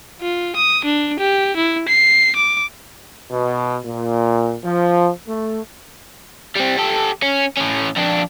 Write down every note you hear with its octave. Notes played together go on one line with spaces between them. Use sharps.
F4
D#6
D4
G4
E4
C7
D6
B2
A#2
F3
A3
G3 C4
G4 A4
C#4
A2 C#4
F2 D4